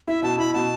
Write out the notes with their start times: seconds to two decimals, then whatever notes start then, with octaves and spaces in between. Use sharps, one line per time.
0.07 E4 E5
0.23 B2 A5
0.38 E4 B5
0.54 B2 A5